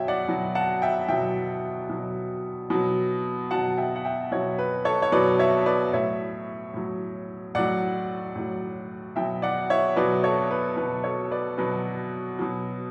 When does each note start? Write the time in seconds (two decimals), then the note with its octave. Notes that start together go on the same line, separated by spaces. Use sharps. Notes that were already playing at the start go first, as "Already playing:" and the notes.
Already playing: B2 F#3 C#5 E5 G5
0.08 D5 F#5
0.29 B2 F#3
0.55 F#5 A5
0.82 E5 G5
1.09 B2 F#3 E5 G5
1.90 B2 F#3
2.70 B2 F#3
3.51 B2 F#3 F#5 A5
3.78 E5 G5
3.96 F#5
4.05 E5 G5
4.31 B2 F#3 C#5 E5
4.59 B4
4.85 A4 C#5
5.02 C#5
5.12 B2 F#3 B4 D5
5.39 C#5 E5
5.66 B4 D5
5.93 A2 F#3 C#5 E5
6.74 A2 F#3
7.55 A2 F#3 D5 F#5
8.35 A2 F#3
9.16 B2 F#3 E5 G5
9.42 D5 F#5
9.70 C#5 E5
9.96 B2 F#3 B4 D5
10.24 A4 C#5
10.51 B4
10.77 B2 F#3 B4
11.04 A4 C#5
11.31 B4 D5
11.58 B2 F#3 B4
12.39 B2 F#3